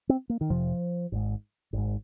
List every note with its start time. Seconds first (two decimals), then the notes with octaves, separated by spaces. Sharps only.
0.09 C4
0.30 A#3
0.41 D#3
0.50 F1 F2 C3 F3
1.12 G#1 G#2
1.73 G#1 G#2